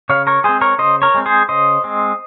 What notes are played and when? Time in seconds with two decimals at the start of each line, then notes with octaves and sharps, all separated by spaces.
0.09 C#3 C#5 F5
0.27 A#4 C#5
0.44 G#3 C4 G#4 C5
0.61 A#4 C#5
0.78 C#3 C5 D#5
1.02 A#4 C#5
1.14 G#3 C4
1.26 G#4 C5
1.49 C#3 C5 D#5
1.84 G#3 C4